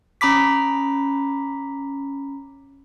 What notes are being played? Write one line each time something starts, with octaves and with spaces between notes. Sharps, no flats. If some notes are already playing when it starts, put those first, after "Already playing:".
C#4 A#5 B5 D6 B6